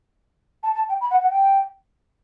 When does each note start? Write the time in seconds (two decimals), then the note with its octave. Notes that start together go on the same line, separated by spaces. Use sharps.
0.63 A5
0.75 A5
0.89 G5
1.01 B5
1.11 F#5
1.21 F#5
1.30 G5